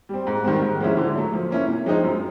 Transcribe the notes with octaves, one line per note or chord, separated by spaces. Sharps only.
G3 C4
G#2
D#3 G3 C4
G#2
F3 G#3 C#4 E4
D3
F#3 A3
F3
A#3 C#4 E4
C3
F3 G#3 C4 D#4
F#2